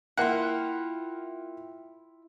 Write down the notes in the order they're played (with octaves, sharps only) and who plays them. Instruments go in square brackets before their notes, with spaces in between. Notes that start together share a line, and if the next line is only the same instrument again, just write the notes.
[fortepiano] A#3 F#5 [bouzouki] E4 F4 [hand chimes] G5